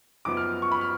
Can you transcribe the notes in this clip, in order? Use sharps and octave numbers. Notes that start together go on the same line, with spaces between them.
F#1 F#2 F3 B3 D6
F6
C#6
B5
F6